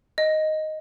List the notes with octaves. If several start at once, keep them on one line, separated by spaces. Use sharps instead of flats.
D#5